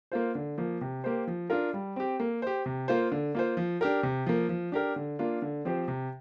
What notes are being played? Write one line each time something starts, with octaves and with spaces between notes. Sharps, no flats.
A#3 F4 C5
D3
F3 A#3
C3
A#3 G4 C5
F3
D4 F4 A#4
G3
C4 G4
A#3
G4 C5
C3
A#3 F4 C5
D3
A#3 F4 C5
F3
D4 G4 A#4
C3
F3 A#3
F3
D4 G4 A#4
D3
A#3 D4 F4
D3
F3 C4 G4 C5
C3